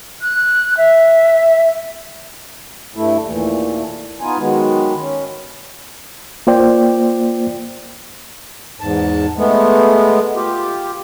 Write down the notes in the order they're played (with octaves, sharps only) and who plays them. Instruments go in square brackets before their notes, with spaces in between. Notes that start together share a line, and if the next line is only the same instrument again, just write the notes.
[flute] F#6
E5
[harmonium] G2 A3 E4
D#2 A#2 E3 A3
B3 D#4 F4 G#5
D#3 F#3 G#3 B3
C#4
[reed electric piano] A#3 F4 C5 D5 G5
[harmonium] E2 G#2 A5
G#3 A3 B3
F4 G4